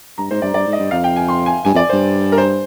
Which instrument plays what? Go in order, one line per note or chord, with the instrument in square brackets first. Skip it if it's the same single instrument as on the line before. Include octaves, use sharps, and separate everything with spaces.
[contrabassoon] G2 [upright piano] A#5
[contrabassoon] G#2 [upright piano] C5
[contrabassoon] G2 [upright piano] D5
[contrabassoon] G2 [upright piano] D5
[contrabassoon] G#2
[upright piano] D#5
[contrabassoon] G2
[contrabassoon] F2 [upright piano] F5
[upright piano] G5
G#5
C6
G#5
[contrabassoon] G2 [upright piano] G#5
[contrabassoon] F2 [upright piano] D5
[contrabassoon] G2 [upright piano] C5
[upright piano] A#4
C5